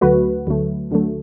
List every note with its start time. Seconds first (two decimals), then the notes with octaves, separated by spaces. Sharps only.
0.01 D2 D3 F#3 A3 F#4 B4
0.47 D2 D3 F#3 A3
0.91 D2 D3 F#3 A3